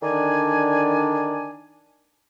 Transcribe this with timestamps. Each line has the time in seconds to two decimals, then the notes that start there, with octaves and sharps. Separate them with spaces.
0.03 D3 D#3 D4 D5 G#5